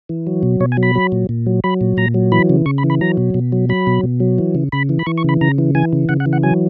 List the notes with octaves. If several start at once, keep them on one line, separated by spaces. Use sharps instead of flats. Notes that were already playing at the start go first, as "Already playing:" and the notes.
E3
F#3
B2
B2 C#5
G#5
F#3
B5
F#3
A#2
A#2
F#3
F#3 B5
A#2
A#2 A#5
F#3
E3 B5
C#3
C#3 C#6
B5
E3
B5
F#3 A#5
B2
B2
F#3
F#3 B5
B2
B2
F#3
E3
C#3
C#3 B5
E3
B5
E3 C#6
C#6
C#3 B5
C#3 A#5
E3
E3 G#5
C#3
C#3 F#5
F#5
E3
F#5
F#3 G#5